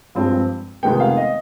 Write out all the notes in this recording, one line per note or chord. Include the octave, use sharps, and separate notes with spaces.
G2 F3 G#3 C4
F1 F2 D#3 G#3 B3 G5
F5
D#5